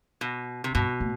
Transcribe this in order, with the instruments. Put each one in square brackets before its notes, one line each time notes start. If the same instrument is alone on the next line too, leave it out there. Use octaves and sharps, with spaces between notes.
[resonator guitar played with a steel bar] B2
C3
[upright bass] G2 [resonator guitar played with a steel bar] B2
[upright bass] A2